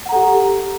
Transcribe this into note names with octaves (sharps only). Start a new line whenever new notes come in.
G4 A4 F#5 A#5